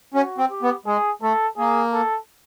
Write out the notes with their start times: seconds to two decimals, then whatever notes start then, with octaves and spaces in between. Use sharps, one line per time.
0.14 C#4 F#4
0.38 C4
0.50 G4
0.63 B3
0.86 G#3 G#4
1.22 A3 A4
1.57 A#3 G#4
1.93 A4